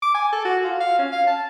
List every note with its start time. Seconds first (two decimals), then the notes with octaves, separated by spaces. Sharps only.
0.02 D6
0.15 G#5
0.32 A4
0.45 F#4
0.64 F4
0.80 F5
0.99 C#4
1.12 F5
1.27 A5